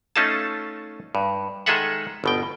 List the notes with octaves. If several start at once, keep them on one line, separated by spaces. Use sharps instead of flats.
A3 C#4 D#4 F4 A4 A5
G2
D#3 G#3 G#4 A4 E5 F#5
G1 B2 G5